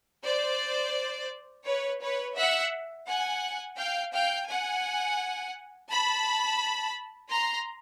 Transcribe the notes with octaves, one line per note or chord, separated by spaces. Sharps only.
C5 D5
B4 C#5
B4 C#5
E5 F#5
F#5 G#5
F5 G5
F5 G5
F#5 G#5
A5 B5
A#5 C6